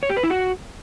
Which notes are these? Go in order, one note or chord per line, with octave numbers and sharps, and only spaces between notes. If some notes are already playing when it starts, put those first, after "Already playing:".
C#5
G4
B4
E4
F#4